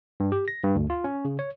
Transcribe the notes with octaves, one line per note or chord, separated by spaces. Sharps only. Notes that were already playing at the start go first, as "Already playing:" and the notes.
G2
G4
A#6
G2
D2
F4
C#4
C#3
C#5